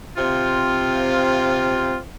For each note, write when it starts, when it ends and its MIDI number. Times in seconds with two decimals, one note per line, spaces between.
0.17 1.97 48
0.17 1.97 60
0.17 1.97 65